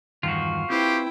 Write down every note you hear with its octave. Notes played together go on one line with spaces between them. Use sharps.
E2 G2 D#3 F4 F#4
C4 E4 G4 B4 C5 G5